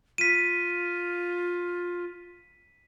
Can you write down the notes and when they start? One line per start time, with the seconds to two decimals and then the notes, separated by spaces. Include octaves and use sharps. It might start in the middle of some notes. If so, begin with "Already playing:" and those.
0.18 F4 B6 D#7